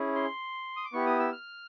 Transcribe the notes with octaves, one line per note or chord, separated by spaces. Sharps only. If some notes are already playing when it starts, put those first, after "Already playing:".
Already playing: C#4 E4 G#4
C6
D#6
D6
B3 E4 G4 C#6
D#6
E6
F6